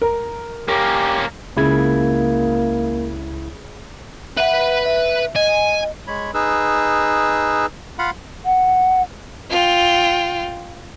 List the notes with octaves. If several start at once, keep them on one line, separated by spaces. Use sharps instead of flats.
A#4
A#3 C#4 G4 A#4
C#2 C#3 A#3 E4 G#6
B4 E5 F#5 B5
E5
D#5 G#5
G#3 C#5 B5
D#4 G#4 B4 E6
F4 F5 F#5 B5
F#5
F4 G5